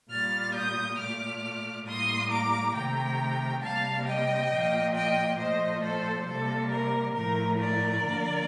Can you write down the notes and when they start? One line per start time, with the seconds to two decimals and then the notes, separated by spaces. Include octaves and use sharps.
0.10 A#2 G3 A#3 F6 A6
0.55 D#6 G6
0.98 A#2 A3 D6 F6
1.86 A2 G3 A#3 C6 D#6
2.31 A#5 D6
2.75 C3 D#3 A3 G5 A#5
3.63 C3 G3 A#3 F5 A5
4.07 D#5 G5
4.51 A#2 F3 A#3
4.95 D#5 G5
5.39 A#2 F3 A3 C5 D#5
5.83 A4 C5
6.27 C3 G3 A#3 A4
6.71 A#4
7.15 A2 F3 A3 A#4
7.60 A#4 D5
8.04 D3 F3 A#3